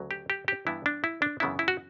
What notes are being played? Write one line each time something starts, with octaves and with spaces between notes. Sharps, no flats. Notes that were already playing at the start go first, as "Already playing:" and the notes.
Already playing: D2 C#3 F#3
G4
G4
G4
G2 E3 B3 D4 E4
D4
E4
D4
F#2 C#3 E3 B3 D4 E4
E4
F#4